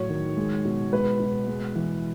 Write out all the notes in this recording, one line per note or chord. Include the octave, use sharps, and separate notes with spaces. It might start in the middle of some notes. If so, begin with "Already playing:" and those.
Already playing: A2 F#3 C#5
D#3
G#3
B2
G#3 B4
B2
G#3
E3